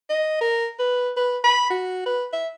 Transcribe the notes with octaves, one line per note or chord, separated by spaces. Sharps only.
D#5
A#4
B4
B4
B5
F#4
B4
E5